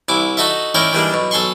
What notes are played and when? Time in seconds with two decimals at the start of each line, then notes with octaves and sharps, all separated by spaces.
0.08 C2 E4 G#5 D6
0.37 D#4 F#4 A4 D#5 E5
0.75 C#4 D#4 E4 A#4 D5 G5
0.93 D#3 E3 G3 G#3 A#3 D4
1.14 B1 B2
1.31 B1 A4 G#5 C6 C#6